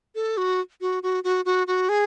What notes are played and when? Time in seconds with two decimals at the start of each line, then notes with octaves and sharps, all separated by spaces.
0.15 A4
0.37 F#4
0.81 F#4
1.03 F#4
1.24 F#4
1.45 F#4
1.67 F#4
1.89 G#4